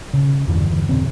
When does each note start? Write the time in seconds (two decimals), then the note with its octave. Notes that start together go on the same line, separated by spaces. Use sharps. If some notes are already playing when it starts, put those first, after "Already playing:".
0.13 C#3
0.48 E2 G2 D3 E3
0.89 B2 D3 C4